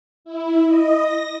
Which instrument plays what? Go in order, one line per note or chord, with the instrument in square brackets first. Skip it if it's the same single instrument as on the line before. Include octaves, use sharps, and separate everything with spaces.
[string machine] E4
D#5
A#6